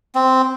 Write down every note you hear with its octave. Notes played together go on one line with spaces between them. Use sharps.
C4